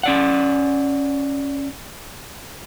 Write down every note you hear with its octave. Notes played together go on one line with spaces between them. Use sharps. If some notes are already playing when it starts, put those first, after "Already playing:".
C#4 D5 F#5